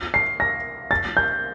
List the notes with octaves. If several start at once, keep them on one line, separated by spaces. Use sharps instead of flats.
C7
A#6
A6
G6